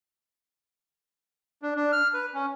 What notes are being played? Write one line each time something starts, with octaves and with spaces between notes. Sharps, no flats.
D4
D4
F6
B4
C#4